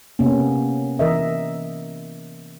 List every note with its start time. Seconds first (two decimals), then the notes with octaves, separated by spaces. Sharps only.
0.19 C3 A#3 B3 C#4
0.99 E3 A#4 D#5 E5